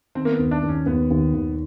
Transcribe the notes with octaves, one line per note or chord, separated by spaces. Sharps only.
D#3 C4
A#3
B3
D#2
D4
D#2
C#4
D#2 B3
D#2
D#2